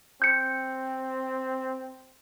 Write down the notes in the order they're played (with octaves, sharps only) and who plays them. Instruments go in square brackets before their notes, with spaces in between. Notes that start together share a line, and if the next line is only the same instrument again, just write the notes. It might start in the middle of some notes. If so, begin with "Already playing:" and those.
[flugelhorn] C4 [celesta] G6 C#7